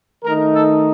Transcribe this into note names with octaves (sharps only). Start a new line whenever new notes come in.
D#3 A3 D#4 A#4
A4